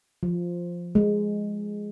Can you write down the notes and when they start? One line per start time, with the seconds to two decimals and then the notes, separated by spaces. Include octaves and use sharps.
0.23 F3
0.95 G#3